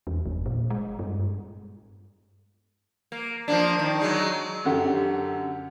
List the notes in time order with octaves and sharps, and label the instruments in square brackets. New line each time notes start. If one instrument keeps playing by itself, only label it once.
[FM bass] E2
G1
A#2
G#3
G2
[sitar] A#3
F3 A#3 D4
D#3
F#3 G#3 D#4
[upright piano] F#2 D3 F#4 G4